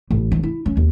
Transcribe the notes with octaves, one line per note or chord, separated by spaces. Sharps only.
A1
D#3
E4
C#4
D#2